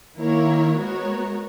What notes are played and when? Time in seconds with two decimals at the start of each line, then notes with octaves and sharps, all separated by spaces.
0.18 D#3 A#3 E4 A#4 C#5
0.77 G#3 B3 F#4 A#4 C#5